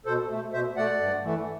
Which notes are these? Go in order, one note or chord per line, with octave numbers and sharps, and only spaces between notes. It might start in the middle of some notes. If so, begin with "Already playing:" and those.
B2 A4 C5
A3
B2 C5 E5
A3 D5 F#5
G2
E3 A3